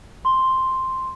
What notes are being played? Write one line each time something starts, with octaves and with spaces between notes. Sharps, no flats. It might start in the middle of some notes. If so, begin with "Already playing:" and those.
C6